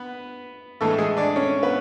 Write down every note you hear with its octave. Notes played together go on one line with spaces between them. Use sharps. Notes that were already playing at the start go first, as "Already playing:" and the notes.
Already playing: B3 B4
A2 E3 G#3 A3 A4
G#3 G#4
D4 D5
C#4 C#5
B3 B4